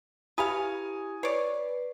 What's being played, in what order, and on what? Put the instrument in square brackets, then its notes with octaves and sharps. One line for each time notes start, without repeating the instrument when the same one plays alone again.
[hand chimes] E4 G4 [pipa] B4 F5 [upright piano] G#5 D#6
[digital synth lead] B4 [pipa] C#5 D5 [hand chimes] C7